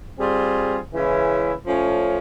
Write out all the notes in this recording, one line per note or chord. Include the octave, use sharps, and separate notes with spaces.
G3 C4 F4 G#4
C#3 E3 G#3 C#4 E4
F3 A3 C#4